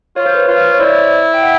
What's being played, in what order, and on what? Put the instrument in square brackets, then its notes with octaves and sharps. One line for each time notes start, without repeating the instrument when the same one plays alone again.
[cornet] F4 [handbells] C#5
[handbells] C5
B4 C#5
[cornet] F4
[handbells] C#5
[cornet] E4 [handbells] C5 D5
[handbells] G5
E5 F#5